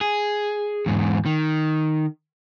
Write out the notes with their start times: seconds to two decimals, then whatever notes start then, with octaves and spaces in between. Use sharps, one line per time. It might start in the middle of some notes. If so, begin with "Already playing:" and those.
0.01 G#4
0.86 E2 G#2
1.26 D#3